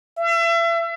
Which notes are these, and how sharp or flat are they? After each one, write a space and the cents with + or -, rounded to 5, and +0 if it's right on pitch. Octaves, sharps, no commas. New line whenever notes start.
E5 +35